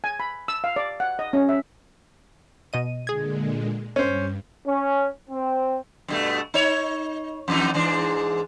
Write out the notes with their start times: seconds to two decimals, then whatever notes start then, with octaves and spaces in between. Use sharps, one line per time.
0.04 G#5
0.20 B5
0.48 E6
0.64 F5
0.76 D5
1.00 F#5
1.19 D#5
1.33 C#4
1.49 E5
2.73 B2 D#5 D#7
3.07 A#2 D3 G#3 G#4 G#6
3.96 G2 C#4 C5
4.66 C#4
5.30 C4
6.08 G2 B2 A3
6.54 D#4 C#5
7.48 F2 E3 D#4
7.74 G#2 E3 D4